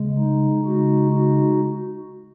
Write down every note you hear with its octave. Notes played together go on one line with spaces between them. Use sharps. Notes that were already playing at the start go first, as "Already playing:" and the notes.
Already playing: C#3 G#3
D#4
C#3 G#3 D#4 F#4
D#4 F#4